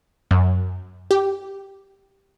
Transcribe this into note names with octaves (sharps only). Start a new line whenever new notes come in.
F#2
G4